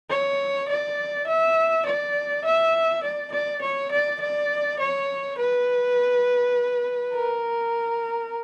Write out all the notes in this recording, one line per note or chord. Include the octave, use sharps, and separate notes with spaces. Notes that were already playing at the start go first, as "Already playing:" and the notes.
C#5
D5
E5
D5
E5
D5
D5
C#5
D5
D5
C#5
B4
A#4